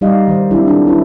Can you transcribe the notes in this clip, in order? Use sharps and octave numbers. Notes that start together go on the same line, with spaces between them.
G3 D#4 G4 D5 D#5 F5
D#3 C5
F#3 C4 D4 E4 G4 D5
B3 D4 E4 F4 A4
C#4 E4 B4